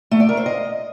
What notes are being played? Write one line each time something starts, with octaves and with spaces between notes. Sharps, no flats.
A3
D5
A#4
C5
D#5